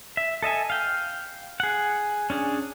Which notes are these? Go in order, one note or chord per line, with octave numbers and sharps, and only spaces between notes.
E5
A4 D#5 E5 G#5
F5 G5
G#4 F#5
C#4 D4 G#4